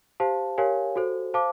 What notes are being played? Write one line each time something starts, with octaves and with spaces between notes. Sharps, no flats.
G4 C5 F5 A5
G4 A#4 C#5 F5 G#5
F#4 A4 C5
C5 F5 A5 D6